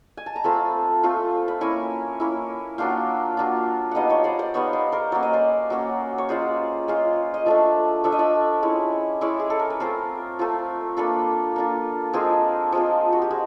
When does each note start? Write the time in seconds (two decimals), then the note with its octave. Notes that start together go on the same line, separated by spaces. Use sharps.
0.17 G#5
0.26 A5
0.36 A#5
0.44 A3 C4 F4 A5 B5
1.03 A3 C4 F4
1.48 B5
1.61 A#3 C#4 E4 G#5 A#5
2.20 A#3 C#4 E4
2.78 F#3 A#3 D4 F4 F5 G5
3.37 F#3 A#3 D4 F4
3.91 G3 B3 D#4 D#5 F5 F#5
4.09 C#5 D#5
4.24 C5 D5
4.39 C5 D5
4.54 G3 B3 D#4 C#5 D#5
4.73 C5 D5
4.92 A#4 C5
5.12 F#3 A#3 C#4 D5
5.23 D#5
5.33 C5 D5
5.70 F#3 A#3 C#4
6.18 C#5
6.29 G#3 C#4 F4 C5 D5
6.88 G#3 C#4 F4
7.34 D#5
7.46 F3 A3 D4 D5 E5
8.04 F3 A3 D4 E5
8.12 D#5
8.19 D5 E5
8.63 G#3 C#4 E4
9.21 G#3 C#4 E4 D5 E5
9.40 G#4
9.50 A4
9.59 A#4
9.70 B4
9.80 A3 C4 F4 A#4 C5
10.39 A3 C4 F4
10.97 A#3 D4 F4 A4 B4
11.56 A#3 D4 F4
12.13 F3 G#3 C4 G#4 A#4
12.72 F3 G#3 C4
13.13 F#4
13.22 G4
13.31 G#3 F#4